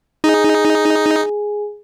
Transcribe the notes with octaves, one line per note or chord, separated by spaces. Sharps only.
D#4 G#4 G#5